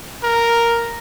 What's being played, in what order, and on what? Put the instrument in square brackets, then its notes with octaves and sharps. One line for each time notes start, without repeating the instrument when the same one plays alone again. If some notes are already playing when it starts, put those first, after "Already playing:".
[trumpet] A#4